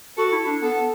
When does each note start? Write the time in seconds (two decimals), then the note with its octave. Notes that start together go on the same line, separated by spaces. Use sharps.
0.17 F#4 A4
0.32 E4
0.46 D4
0.62 B3 A4